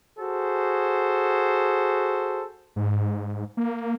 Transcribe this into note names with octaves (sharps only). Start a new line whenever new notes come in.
F#4 G#4 A4 C5
G#2
A#3